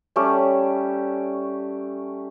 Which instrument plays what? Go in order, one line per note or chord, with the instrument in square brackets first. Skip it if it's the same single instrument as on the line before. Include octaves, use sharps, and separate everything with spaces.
[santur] G3 A3 C#4 G4